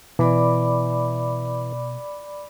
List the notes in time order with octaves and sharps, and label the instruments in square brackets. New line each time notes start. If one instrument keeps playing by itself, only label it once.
[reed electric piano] B2 [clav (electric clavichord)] E3 [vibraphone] D5 B5 D6